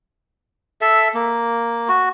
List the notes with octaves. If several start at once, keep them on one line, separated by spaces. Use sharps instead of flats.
A4 E5
A#3
F#4